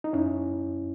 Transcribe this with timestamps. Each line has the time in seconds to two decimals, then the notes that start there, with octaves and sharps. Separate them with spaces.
0.04 D#4
0.13 F#2 C#4 E4